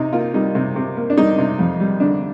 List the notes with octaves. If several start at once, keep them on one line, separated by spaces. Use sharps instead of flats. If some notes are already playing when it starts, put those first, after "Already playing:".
Already playing: C3 D#4
A#3 F4
G3 D#4
C3
C3
A#3
D4
G3 D#4
C3
F2
G3
D3 D4